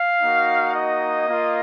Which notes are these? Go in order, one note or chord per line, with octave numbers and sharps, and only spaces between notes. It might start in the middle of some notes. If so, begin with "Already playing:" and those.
Already playing: F5
A#3 D#4 F#4
D#5
A#3 F4